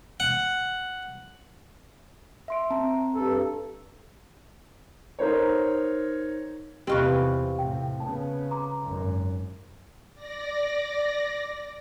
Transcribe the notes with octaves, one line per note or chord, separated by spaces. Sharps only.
F#5
E5 C6 D7
C4 A5 A#5
G2 A4
D#4 A#4 C5 C#5
E2 C3 C4 F4 G4 B4 D#5 C#6
A2 C3 G5
C#3 B3 A5
A#5 C6 D6
G#1 F#2
D5 A#6